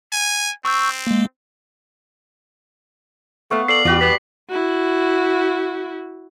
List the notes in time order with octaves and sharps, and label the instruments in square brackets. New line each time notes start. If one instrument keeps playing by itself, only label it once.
[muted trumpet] G#5
[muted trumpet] C4 [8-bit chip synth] C#6 E6 G6
[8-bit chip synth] G#3 A#3
[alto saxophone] A3 [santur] B3 F5 [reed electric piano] C#6
[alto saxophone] A4 [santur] D5 [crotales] C7 F#7
[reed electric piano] E2 [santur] G3 F#4 D5 [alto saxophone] F4
[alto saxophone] B3 [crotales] B6
[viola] E4 F#4